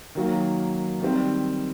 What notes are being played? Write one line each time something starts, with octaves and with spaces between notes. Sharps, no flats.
D#3 F#3 A#3
D#3 G3 C4